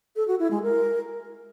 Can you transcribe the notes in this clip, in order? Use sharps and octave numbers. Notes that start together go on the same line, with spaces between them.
A4
F#4
E4
G#3
A#4